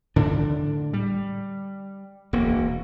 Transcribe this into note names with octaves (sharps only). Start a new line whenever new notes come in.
A2 D3 D4
G3
E1 D2 A#3